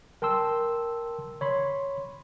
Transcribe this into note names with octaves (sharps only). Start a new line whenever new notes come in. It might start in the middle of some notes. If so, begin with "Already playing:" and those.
A#4 G5 A5 C6 E6
C#5 B5 C6